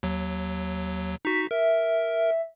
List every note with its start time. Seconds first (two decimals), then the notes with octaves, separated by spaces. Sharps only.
0.03 D#2 F#3
1.25 D#4 F#4 B6
1.51 A#4 E5